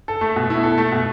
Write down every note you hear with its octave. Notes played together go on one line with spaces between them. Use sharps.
A4
A3
B2
E4
A4
A3
B2